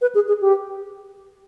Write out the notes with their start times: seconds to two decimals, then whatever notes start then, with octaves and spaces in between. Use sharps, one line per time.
0.01 B4
0.15 G#4
0.28 G#4
0.41 G4